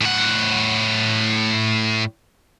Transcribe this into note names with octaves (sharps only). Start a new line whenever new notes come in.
A2 F#5